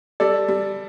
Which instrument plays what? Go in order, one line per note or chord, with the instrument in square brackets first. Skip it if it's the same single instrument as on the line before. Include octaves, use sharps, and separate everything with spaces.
[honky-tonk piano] G3 [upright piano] A4 D5
[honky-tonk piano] G3